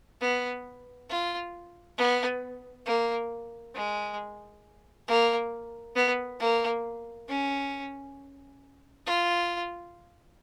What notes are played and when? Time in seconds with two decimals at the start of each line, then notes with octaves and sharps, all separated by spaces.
0.21 B3
1.10 F4
1.98 B3
2.86 A#3
3.75 G#3
5.08 A#3
5.95 B3
6.40 A#3
7.29 C#4
9.06 F4